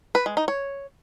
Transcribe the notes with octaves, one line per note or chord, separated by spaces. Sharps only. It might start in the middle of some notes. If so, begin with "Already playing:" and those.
B4
G#3
D#4
C#5